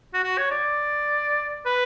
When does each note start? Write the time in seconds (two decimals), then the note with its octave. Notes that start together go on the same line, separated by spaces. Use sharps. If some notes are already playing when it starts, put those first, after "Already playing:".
0.14 F#4
0.24 F#4
0.38 C#5
0.51 D5
1.66 B4